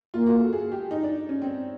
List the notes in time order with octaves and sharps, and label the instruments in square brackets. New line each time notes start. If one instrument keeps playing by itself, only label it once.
[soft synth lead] A#3 [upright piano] F4
[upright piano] F#4
A4
G#4
G4
D#4
D4
C#4
C4